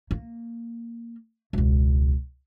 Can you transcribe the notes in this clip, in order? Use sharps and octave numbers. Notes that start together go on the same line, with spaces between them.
A#3
E1 C#2